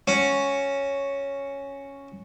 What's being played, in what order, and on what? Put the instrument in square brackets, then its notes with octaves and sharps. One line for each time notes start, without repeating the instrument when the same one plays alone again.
[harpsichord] C#4 F#4